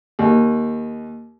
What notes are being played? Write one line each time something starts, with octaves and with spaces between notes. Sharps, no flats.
D#2